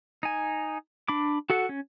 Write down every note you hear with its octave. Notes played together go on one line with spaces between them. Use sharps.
D#4 G#5
D4 B5 D6
F#4 A4 F#5
C#4